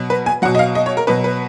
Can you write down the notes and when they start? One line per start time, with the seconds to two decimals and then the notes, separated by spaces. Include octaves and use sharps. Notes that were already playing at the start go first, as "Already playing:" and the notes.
Already playing: B2 F#3
0.10 B4
0.26 G#5
0.42 F#3 F#5
0.45 B2
0.55 D#5
0.59 F5
0.75 D#5
0.86 C#5
0.97 A#4
1.07 B2 F#3 B4
1.24 B4